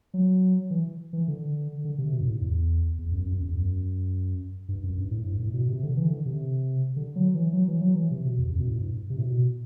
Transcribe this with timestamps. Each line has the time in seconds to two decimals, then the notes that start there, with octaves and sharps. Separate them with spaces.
0.14 F#3
0.71 E3
1.13 E3
1.28 D3
1.85 D3
1.98 C3
2.12 B2
2.21 G2
2.27 A2
2.41 E2
2.99 E2
3.12 F#2
3.26 F#2
3.41 E2
3.55 F#2
4.68 G2
4.83 F#2
4.98 G2
5.11 A2
5.26 G2
5.40 A2
5.54 B2
5.68 C3
5.83 D3
5.97 E3
6.10 D3
6.26 C3
6.96 D3
7.16 F#3
7.34 E3
7.53 F#3
7.68 E3
7.81 F#3
7.96 E3
8.11 C3
8.25 B2
8.38 E2
8.52 F#2
8.60 B2
8.68 A2
8.81 G2
9.10 C3
9.18 A2
9.23 B2